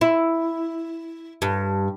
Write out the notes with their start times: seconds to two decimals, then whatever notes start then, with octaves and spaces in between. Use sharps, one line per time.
0.01 E4
1.42 G2